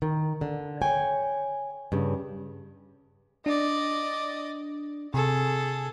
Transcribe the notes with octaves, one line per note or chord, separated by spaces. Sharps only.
D#3
D3
C#5 G5 G#5
G2 C#3
D4 D5 D#5
C3 G#4 A4